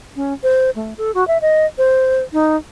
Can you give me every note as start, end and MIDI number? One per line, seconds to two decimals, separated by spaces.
0.16 0.33 61
0.43 0.70 72
0.76 0.94 57
0.98 1.11 69
1.14 1.26 66
1.27 1.38 76
1.41 1.66 75
1.78 2.23 72
2.33 2.56 63